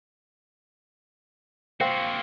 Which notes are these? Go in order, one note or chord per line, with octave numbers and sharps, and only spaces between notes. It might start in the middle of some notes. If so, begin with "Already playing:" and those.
A#3 C4 F#4 C5 F5